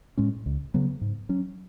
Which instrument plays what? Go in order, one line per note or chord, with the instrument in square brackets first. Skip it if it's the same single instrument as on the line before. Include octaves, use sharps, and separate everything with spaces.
[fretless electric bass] A2 G#3 C#4
C#2
C#3 F#3 B3
G#2
F#3 C#4